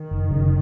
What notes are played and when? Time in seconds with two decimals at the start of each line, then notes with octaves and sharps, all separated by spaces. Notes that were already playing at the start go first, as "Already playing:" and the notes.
Already playing: D#3
0.11 F#1
0.31 F#2 C#3